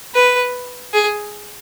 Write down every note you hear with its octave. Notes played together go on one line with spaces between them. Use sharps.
B4
G#4